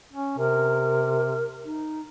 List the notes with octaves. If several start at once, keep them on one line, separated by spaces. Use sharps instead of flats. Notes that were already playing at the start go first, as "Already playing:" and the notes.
C#4
C3 A#4
D#4